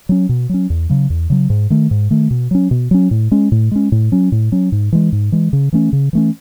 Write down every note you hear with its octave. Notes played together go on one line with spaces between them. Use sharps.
F#3 C#4
B2
F#3 C#4
E2
C#3 F#3
E2
C#3 F#3
G#2
D#3 A3
G#2
D#3 A3
B2
F#3 C#4
B2
F#3 C#4
A2
G#3 C#4
A2
G#3 C#4
A2
F#3 C#4
A2
F#3 C#4
G#2
E3 G#3
G#2
E3 G#3
C#3
E3 A3 C#4
C#3
E3 A3 C#4